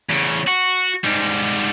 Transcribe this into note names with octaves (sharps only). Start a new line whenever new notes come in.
E2 C#3
F#4
G#2 G3